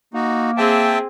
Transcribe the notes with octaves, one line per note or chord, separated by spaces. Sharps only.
A#3 D#4 F#4
C4 G#4 E5 G5 A5